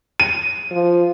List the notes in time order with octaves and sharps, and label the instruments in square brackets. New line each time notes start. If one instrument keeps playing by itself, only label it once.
[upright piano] D#7
[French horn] F3